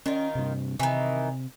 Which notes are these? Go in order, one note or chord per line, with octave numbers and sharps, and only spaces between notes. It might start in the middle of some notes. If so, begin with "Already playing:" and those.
D#3 C#4 F4
G2 C3
C3 D#3 E3